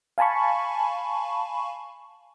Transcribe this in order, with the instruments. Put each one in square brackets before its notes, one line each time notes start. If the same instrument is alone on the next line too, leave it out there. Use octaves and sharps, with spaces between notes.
[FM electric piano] F5 G#5 A5 B5 C#6